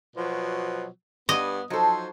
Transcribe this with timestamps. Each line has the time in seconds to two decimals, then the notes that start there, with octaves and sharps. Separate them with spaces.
0.16 B2 F3 F#3
1.29 G2 B3 D#5
1.70 F3 F#3 D#4 A4 C5